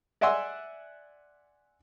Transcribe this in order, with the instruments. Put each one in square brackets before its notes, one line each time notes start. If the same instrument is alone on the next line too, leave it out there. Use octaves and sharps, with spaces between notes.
[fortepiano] D5 E5 F#5 G#5 C6 E6